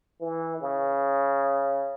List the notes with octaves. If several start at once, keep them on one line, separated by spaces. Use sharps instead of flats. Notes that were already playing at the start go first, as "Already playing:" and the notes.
E3
C#3